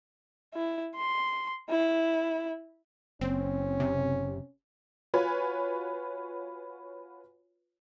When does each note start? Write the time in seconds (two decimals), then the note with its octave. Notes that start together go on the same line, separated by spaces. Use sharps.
0.54 E4
0.96 C6
1.70 E4
3.21 F#1 C4 C#4
3.80 C3
5.14 F4 F#4 B4 C#5 G#5